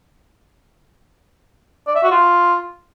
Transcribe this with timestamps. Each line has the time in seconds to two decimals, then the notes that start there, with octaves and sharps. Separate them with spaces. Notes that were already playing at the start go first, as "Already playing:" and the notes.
1.87 D5
1.95 E5
2.03 F#4
2.11 F4